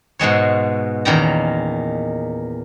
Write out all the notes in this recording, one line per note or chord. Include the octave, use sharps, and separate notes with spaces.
G#2 B2 G#3 C#5
E2 A#2 D#3 C#4 G5 A#5